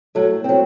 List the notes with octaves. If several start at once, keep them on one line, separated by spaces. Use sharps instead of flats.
A2 F#3 A3
A2 F#3 C4